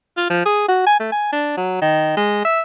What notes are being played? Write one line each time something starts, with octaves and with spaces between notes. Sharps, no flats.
F4
F3
G#4
F#4
G#5
A3
G#5
D4
F#3
D#3
G#3
E5